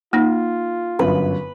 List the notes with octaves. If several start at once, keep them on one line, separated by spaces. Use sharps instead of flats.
A#3 D#4 F4
G1 F#2 B4